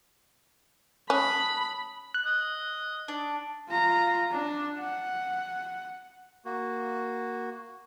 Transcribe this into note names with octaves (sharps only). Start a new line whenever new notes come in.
C#4 A5 B5 D#6 F#6
F#6
D#5
D4
F4 A#5
D4
F#5
A#3 F#4